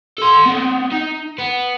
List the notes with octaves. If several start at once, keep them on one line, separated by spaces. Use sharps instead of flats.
A4 C6
B3 C4
D#4
B3